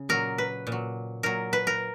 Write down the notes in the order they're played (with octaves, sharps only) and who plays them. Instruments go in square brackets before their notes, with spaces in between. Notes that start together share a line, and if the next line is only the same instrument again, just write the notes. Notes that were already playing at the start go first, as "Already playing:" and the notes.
Already playing: [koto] C#3
A#2 F#3 A#4
B4
A#2
F#3
A#2 F#3 A#4
B4
A#4